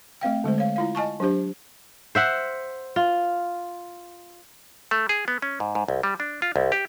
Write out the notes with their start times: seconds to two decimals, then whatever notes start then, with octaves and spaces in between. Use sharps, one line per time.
0.21 A3 C4 F5 G5
0.44 D3 G#3 A3 C5
0.58 C#5 F5
0.76 E4 F4 F5
0.95 D#5 G#5 A5 C#6
1.20 F#3 D4 G4 C5
2.15 C5 E5 F#5
2.96 F4
4.91 A3
5.09 G#4
5.28 B3
5.42 C#4
5.60 G#2
5.75 G#2
5.88 C2
6.03 G3
6.20 D4
6.42 F4
6.56 C2
6.72 G4